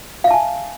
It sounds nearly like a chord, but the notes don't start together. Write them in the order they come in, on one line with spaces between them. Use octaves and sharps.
F5 E5 A5 G#5